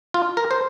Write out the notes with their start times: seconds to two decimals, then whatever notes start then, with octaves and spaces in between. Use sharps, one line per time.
0.14 F4
0.37 A#4
0.51 C5